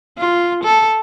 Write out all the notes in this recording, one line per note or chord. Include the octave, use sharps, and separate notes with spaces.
F4
A4